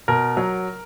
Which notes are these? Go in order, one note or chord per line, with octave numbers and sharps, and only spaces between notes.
B2 A#4
F#3